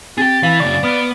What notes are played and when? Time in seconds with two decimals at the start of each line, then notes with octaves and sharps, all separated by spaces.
0.18 C4 G4 G#4 A6
0.43 E3 F5 B5 F7 G7
0.60 F#2 C#3 D5 C#6
0.83 B3 D6 D#6 F6 D7